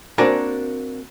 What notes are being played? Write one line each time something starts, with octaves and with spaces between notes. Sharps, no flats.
A#3 C4 D4 F#4 A#4 G#5